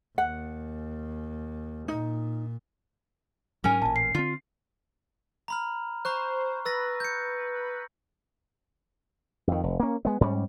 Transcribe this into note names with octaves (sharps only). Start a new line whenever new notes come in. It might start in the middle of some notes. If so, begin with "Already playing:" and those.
D#2 F#5
A#2 D#4
G#2 F#3 C#4 A#4 G#5
A1 A#2 A5
C7
D3 C4 F4
A#5 B5 F6
C5 A#5 C#6 F#6
B4 E6 A6 A#6
G6 C#7
F2 D#3
F1
A#3 C#4
G#3 B3
G#2 G3 C#4